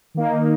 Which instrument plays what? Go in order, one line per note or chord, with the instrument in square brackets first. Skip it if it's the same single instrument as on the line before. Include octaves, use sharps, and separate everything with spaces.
[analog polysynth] D#3 A#3 D#4